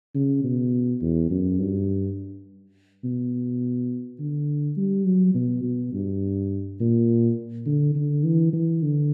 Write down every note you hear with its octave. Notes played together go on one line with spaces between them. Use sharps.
C#3
B2
E2
F#2
G2
B2
D3
G3
F#3
B2
B2
G2
A#2
D3
D3
E3
E3
D3